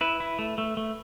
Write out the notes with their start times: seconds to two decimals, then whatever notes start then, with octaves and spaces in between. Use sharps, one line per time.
0.01 E4 B4
0.20 E4
0.39 A3
0.58 A3
0.77 A3